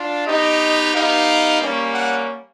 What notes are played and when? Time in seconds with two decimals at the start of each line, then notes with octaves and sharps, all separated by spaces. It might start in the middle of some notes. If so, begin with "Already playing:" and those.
Already playing: D4 F4
0.26 B3 D#4 G4 D#5
0.93 B3 D#4 G4 F5
1.61 G3 A#3 C#4
1.94 F#5